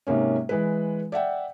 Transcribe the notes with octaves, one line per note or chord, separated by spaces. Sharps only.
G#2 C3 G#3 A#3 C#4
E3 G#3 B4
D5 E5 F#5 G5